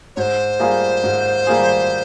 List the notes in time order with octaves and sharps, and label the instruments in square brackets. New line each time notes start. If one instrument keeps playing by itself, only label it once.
[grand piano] G#2 [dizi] C5 C#5
[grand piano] G3 A#3 F4 G#4
G#2
G3 A#3 F4 G#4